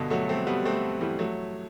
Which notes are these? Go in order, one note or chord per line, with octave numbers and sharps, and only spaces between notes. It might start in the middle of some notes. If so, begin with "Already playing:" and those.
Already playing: G2 B2 D3
F#3 A3
A3 C4
G3 B3
A3 C4
E3 G3
F#3 A3